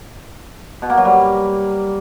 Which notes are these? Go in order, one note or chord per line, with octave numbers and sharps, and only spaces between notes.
B2
A#3
F#3
G3